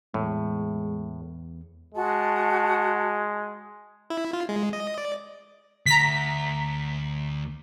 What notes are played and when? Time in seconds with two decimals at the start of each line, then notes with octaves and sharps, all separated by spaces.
0.14 E2 A2 G#3
1.94 G#3 F#4 A5
4.10 E4
4.33 F4
4.49 G#3
4.73 D#5
4.98 D5
5.86 D2 A#5 B6